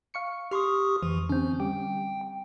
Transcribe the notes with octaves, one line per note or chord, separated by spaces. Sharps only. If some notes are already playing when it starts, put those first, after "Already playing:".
F5 C#6 C#7
G4 C6 C#6 D#6 F6
F2 E3
D3 C4 C#4
G3 G5